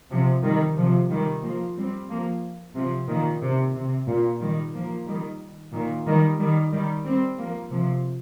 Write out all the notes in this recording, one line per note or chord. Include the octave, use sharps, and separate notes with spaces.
C3 F3
D#3 G3
C3 F3
D#3 G3
F3 A#3
G3 C4
F3 A#3
C3 F3
A#2 D#3
C3
C3
A#2
D#3 G3
F3 A#3
D#3 G3
A#2 D#3
D#3 G3
D#3 G3
D#3 G3
G3 C4
F3 A#3
C3 F3